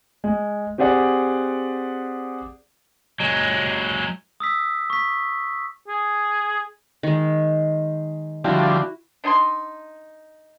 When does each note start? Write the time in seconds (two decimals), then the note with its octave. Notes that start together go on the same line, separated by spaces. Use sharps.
0.24 G#3
0.78 C4 G4 G#4 D5 F#5
3.20 F#3 G#3
4.40 D#6 E6 B6
4.90 C#6 B6
5.88 G#4
7.03 D#3 G#3
8.44 D3 F3 G3 E4 F#4
9.24 D4 D#4 G#5 C6